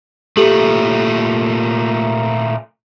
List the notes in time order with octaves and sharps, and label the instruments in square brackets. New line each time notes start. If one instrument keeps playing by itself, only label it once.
[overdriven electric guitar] A#2 A3 [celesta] G4 A4 F#7